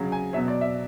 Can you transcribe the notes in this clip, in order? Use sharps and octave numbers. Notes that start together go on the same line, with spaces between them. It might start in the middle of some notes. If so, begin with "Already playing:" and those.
Already playing: C#3 F#3
G#5
B2 F#3 E5
D5
E5